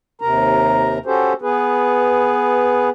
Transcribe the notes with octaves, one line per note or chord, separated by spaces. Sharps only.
D#2 C3 A#4 A#5
C#4 F#4 G4 A4 C5
B3 G#4 B4